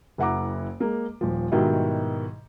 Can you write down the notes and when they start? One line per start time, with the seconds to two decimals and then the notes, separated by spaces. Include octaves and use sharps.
0.18 F#1 E4 F#5 A#5 D6
0.80 G#3 A#3
1.21 D#1 F3
1.52 G#2 B2 D#3 F#3 G3 E4